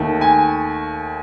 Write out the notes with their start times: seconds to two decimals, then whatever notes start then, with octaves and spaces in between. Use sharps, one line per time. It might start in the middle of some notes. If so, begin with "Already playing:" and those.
Already playing: D#2 D#3 A3
0.21 G#5